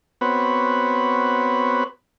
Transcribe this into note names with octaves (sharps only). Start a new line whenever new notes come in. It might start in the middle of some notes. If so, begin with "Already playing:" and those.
B3 C4 F#4 B4 C#5